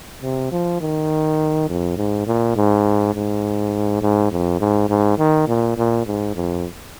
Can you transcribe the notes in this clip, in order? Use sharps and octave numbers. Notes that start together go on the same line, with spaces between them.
C3
F3
D#3
F2
G#2
A#2
G#2
G#2
G#2
F2
G#2
G#2
D#3
A#2
A#2
G#2
F2